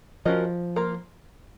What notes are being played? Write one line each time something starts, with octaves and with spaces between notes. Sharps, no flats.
F3 C#4 F#4 A#4 D#5
A#3 F4 A#4